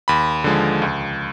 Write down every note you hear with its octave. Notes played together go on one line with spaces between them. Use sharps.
D#2 B5
D3 F3 G#3
C#2